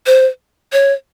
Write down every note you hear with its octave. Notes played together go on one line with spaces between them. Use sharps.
C5
C#5